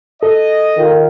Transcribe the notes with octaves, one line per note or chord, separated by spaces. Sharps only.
A4 D#5
D#3 F4